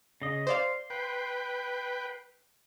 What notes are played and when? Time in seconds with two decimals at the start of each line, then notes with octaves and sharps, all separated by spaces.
0.22 C#3 D#5
0.47 C5 D5 F5 C6
0.90 B4 G5